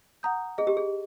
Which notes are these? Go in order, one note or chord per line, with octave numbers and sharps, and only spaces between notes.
F#5 A#5 D#6 G6
G#4 D#5
G4
G#4